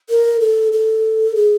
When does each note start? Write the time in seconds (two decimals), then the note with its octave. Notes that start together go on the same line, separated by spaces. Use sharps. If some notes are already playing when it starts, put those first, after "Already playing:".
0.10 A#4
0.40 A4
0.72 A4
1.35 G#4